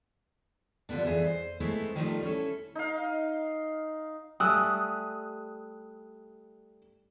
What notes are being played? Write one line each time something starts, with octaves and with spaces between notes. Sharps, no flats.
D3 F3 G3 B3 D4
F2 E3 G#4 E5
C5
G#3 A3 B3 C4 E4 C5
D#3 F3 G3 A3 C#4 D#4
C#4 E4 A4
D#4 F5
G3 A3 G#5 D#6 E6 F#6